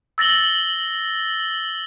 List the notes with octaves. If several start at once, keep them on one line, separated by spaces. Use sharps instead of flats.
E6 A6 A#6 F#7 G7